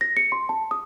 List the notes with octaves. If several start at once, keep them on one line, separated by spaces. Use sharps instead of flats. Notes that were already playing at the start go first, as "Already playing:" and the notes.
A#6
C#7
C6
A5
D#6